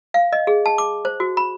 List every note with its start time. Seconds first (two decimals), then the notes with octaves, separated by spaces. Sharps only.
0.14 F5
0.33 D#5
0.47 G#4
0.66 A5
0.78 D6
1.05 C5
1.20 F#4
1.37 B5